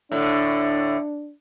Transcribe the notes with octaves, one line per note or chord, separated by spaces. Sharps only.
A2 D3 D4